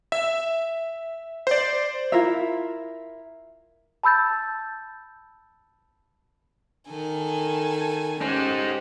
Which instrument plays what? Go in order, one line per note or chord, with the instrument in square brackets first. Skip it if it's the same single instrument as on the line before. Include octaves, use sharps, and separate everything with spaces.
[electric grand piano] E5
C5 D5
[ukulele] E4 F4 A#4 E5
[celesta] A5 B5 E6 G6 A6
[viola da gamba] D#3 [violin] A4 G#5
[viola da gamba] C#4 G4 [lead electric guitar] D#4 C5